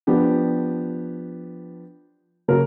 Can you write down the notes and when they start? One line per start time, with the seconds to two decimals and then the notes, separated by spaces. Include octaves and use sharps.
0.07 F3 B3 D4 G4
2.48 C#3 F#3 A#3 A#4